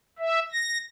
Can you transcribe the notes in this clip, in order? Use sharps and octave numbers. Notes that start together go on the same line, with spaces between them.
E5
A#6